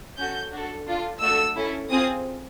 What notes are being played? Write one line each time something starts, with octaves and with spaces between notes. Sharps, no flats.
C#4 F#4 A4 G6
D4 F#4 A4
D4 F4 A4
A3 D4 F#4 A4 E6
C#4 E4 A4
C4 F4 G#4 D#6